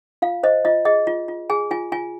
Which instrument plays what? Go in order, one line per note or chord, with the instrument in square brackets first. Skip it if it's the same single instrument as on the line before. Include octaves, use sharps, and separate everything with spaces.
[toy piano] F4 F5
C5 D#5
F4 D#5
G#4 D#5
F4
F4
G#4 G#5
F4 G#5
F4 G#5